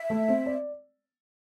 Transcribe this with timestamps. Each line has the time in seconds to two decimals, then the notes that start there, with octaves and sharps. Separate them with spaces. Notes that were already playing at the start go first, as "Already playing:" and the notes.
Already playing: E5
0.10 A3
0.29 C4
0.46 D5